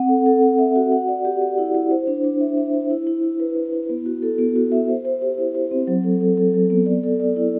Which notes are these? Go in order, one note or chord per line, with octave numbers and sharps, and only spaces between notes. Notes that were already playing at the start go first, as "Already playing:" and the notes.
Already playing: C4 F#5
A4
A4
A4
E5
F#4
F#5
D5
G4
D5
E4
E4
C5
D4
D4
E5
E5
C5
E4
E4
E4
B4
E4
E4
B3
F#4
A4
B3
F#4
E5
C5
C5
G4
E4
C5
C4
F#3
A4
A4
A4
F#3
B3
D5
A4
D5
E4